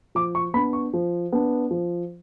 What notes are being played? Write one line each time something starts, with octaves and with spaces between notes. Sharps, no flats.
F3 D6
C#6
B3 D4 B5
C#6
F3
B3 D4
F3